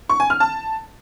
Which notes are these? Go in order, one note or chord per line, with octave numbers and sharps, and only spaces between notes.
C#6
G#5
F6
A5